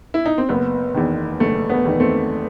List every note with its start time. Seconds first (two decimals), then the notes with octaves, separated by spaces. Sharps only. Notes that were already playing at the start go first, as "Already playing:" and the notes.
0.14 E4
0.26 D#4
0.38 C4
0.49 F#1 B3
0.94 E2 D#3
1.40 F#1 A3
1.70 B3
1.85 E2 D#3
2.00 A3 C4